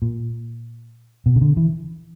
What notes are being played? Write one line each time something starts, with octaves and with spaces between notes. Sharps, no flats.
A#2
B2
C#3
D3
E3